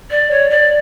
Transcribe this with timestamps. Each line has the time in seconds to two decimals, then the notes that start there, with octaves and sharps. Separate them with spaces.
0.11 D5
0.31 C#5
0.50 D5